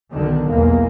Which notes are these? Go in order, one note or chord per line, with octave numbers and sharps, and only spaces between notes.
B1 D3 D#3
B1 E2 G#3 A#3